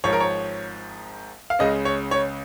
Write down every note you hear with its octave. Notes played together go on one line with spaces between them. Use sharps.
G#1 G#2 F3 C#5
A#4
C#5
F5
C#2 C#3 G#3 C#4 D#5
C#5
C#5